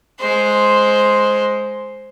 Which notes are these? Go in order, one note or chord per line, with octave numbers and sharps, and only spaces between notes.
G#3 C5